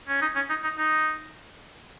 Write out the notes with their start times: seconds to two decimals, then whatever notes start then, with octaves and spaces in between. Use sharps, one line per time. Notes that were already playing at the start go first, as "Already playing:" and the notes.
0.08 C#4
0.21 D#4
0.36 C#4
0.50 D#4
0.64 D#4
0.78 D#4